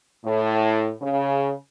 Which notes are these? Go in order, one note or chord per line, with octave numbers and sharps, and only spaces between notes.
A2
C#3